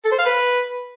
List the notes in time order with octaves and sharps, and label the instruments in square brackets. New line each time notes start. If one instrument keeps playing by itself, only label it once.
[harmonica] A4
C5
F5
B4